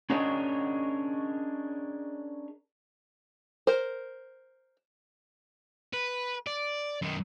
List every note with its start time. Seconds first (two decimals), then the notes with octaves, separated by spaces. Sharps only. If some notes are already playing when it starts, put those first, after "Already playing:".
0.10 C#4 D4 G#4 A#4 C#5 D#5
3.67 A#4 C5
5.93 B4
6.47 D5
7.02 F#2 D#3